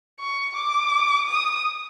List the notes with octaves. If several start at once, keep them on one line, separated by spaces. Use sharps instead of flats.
C#6
D6
D#6